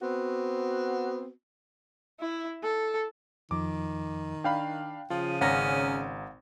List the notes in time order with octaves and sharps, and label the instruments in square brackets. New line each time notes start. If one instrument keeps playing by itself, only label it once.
[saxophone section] B3 C4 F#4
[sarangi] E4
A4
[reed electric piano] F2 F3 [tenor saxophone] D#3 [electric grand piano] D6
[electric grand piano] D4 F5 B5 [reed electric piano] G5
[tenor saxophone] C#3 [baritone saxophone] F3 [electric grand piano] F4
[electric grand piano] G#1 A#5 A#6 [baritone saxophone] C#4 [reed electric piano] F5 F#5